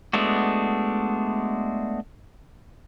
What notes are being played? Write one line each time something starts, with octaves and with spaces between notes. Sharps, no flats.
G#3 A3 B3 D4 F#4